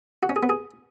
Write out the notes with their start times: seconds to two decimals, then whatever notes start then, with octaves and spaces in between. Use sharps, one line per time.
0.23 F#4
0.29 C#4
0.36 G#4
0.43 B3
0.49 G#4